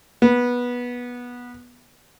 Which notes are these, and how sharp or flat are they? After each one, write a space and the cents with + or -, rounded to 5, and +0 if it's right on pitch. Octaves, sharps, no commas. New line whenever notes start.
B3 -15